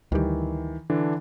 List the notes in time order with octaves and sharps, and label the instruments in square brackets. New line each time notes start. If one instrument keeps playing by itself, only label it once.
[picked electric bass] D2 G3 [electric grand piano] D#3 E3
[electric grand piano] D3 E3 D4